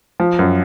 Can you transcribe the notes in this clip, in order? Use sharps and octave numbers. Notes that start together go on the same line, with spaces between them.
F3
F#2